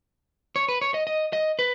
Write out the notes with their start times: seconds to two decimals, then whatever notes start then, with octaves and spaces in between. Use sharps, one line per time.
0.56 C#5
0.68 B4
0.81 C#5
0.94 D#5
1.07 D#5
1.33 D#5
1.59 B4